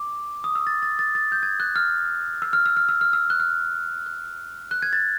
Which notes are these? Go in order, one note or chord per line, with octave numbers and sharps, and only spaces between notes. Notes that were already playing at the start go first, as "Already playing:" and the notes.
Already playing: D6
D#6
E6
A6
A6
A6
A6
G6
G#6
F#6
F6
E6
F6
E6
F6
E6
F6
E6
F#6
F6
F#6
F#6
G#6
A6